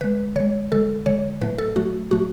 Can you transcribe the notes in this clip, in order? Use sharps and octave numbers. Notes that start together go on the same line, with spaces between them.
D3 G#3 B4
D3 G#3 C#5
D3 G#3 A4
D3 G#3 C#5
A2 F#3 A3 B4
A4
A2 F#3 A3 F#4
A2 F#3 A3 F#4